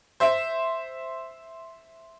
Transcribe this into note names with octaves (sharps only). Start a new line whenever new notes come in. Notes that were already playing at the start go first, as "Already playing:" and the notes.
C5 E5